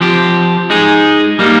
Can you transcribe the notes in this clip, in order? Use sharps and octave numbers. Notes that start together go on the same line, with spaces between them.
F3 C4 G4
G#3 D#4 G#4
G3 A#3 D#4